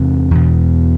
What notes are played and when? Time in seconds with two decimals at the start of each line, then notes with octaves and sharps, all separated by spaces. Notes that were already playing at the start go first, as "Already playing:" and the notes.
Already playing: E2 C3
0.31 E2 B2